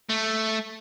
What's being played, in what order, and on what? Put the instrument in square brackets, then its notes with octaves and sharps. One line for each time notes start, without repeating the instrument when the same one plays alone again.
[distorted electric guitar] A3